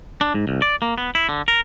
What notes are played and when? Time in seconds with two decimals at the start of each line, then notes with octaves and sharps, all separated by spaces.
0.21 D4
0.34 G#2
0.47 C2
0.62 D5
0.82 A#3
0.98 B3
1.15 E4
1.29 D3
1.48 A#4